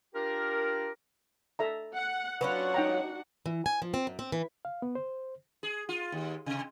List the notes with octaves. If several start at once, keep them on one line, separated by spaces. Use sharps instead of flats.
D4 F4 G4 A#4
A4 E5 A#5
F#5
F#3 C#4 D4 F4 F#4 B4 F#5
D#4 G5 A#5
E3
G#5
F3
C4
F#2
C4
E3
F5
B3
C5
G#4
F4
D#2
C3